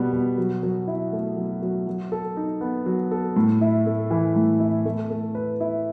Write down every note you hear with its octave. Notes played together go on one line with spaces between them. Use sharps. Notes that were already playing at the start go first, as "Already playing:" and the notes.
Already playing: B2 G3 B3
B2
F#3
F#3
E4
A3
F#3
F#3
F#3
A4
D#4
B3
F#3
A4
A2
E4
A3
E3
A2
E4
A3
A3
B4
E4